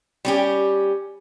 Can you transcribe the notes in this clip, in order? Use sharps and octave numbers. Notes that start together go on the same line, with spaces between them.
G3 C#4 G4